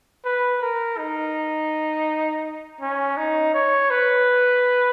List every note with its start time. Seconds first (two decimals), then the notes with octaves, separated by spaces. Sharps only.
0.25 B4
0.62 A#4
0.98 D#4
2.81 C#4
3.17 D#4
3.54 C#5
3.90 B4